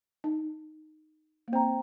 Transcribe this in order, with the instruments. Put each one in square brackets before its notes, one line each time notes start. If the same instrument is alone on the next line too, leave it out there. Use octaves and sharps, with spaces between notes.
[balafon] D#4
A#3
[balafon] C4 [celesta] C5 G5 A#5